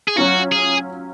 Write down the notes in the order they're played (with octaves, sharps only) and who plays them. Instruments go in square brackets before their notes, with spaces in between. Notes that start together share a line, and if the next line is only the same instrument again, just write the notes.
[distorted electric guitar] G#4
[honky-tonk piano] F#3 C#4 F4 [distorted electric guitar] F#4
[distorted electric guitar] G#4